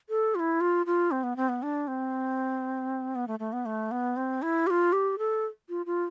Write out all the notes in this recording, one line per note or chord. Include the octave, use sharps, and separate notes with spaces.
A4
F4
E4
F4
F4
C4
B3
C4
B3
D4
C4
B3
A3
A3
B3
A3
B3
C4
E4
G4
F4
G4
A4
F4
F4